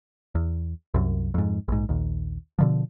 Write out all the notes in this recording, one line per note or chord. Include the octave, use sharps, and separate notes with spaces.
E2
C2 F#2
F2 G#2
A#1 G#2
A#1 D#2
B2 D3 F3